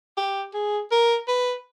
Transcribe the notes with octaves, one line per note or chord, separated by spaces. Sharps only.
G4
G#4
A#4
B4